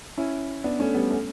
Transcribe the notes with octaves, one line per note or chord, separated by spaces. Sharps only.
C#4 E4
B3 D4
A3 C#4
G3 B3
A3 C#4